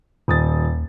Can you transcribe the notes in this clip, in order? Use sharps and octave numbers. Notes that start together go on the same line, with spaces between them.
D#1 D#2 D#6 A6